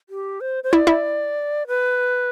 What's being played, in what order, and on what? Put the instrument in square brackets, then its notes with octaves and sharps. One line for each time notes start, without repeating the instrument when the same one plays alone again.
[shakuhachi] G4
C5
C5
[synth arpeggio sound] E4 [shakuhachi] D5
[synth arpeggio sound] E4
[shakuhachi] B4